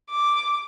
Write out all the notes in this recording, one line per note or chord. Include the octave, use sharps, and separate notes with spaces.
D6